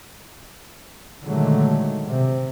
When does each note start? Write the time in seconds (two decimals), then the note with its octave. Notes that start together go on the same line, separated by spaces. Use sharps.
1.23 A#2 D3 D#3 F#3 G#3 A3
2.05 C3